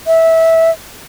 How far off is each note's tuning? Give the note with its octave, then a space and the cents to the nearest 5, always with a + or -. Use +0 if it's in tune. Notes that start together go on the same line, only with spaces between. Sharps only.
E5 -15